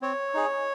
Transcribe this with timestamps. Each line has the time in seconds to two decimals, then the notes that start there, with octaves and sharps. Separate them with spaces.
0.02 C4 C#5
0.34 D#4 G#4